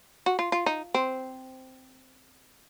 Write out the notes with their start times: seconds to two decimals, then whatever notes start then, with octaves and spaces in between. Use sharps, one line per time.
0.26 F#4
0.39 F4
0.52 F4
0.66 D#4
0.94 C4